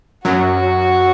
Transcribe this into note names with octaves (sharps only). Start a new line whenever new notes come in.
F#2 F#3 F#4